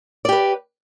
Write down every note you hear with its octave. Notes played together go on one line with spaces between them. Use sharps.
G4 B4 D5